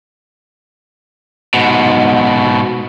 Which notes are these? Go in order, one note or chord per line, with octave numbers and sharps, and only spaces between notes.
G#2 B2